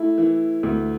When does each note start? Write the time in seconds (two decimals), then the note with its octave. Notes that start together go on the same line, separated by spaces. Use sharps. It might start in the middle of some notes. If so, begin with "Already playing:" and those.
Already playing: A3 E4
0.18 E3
0.63 D2